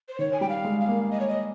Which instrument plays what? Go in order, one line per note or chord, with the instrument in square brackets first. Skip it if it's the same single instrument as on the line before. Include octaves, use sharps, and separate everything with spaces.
[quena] C5
[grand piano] D#3 [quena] C#5
[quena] G#5
[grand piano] G3 [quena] G5
[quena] F5
[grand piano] G#3
[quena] F5
[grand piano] A#3
[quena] D#5
C#5
D#5